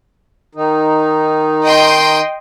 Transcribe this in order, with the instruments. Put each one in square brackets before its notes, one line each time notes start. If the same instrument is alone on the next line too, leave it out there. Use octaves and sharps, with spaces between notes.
[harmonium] D#3 D#4
[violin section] D#5 G5 C6